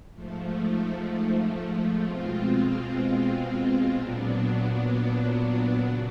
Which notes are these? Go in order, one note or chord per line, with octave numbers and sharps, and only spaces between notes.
G#2 F3 A3
B2 G#3 C4 F4
A#2 F#3 B3 D4
C#3 F#3